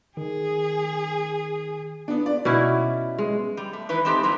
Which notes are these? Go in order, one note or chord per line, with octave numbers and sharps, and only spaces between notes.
D#3 G#4
B3 D4
D5
B2 C#4 E4
G#3
G3
A3
D#3 E3 B4
G#3 A3 C4 D#4 G4 A4
G2 C3 E3 F#3 A#5